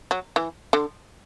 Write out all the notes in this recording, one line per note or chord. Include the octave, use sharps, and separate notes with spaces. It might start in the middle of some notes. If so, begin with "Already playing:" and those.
F#3
E3
D3